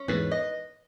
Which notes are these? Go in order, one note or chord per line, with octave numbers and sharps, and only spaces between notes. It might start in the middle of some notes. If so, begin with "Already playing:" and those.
Already playing: C#4
E2 G#2 B4
D#5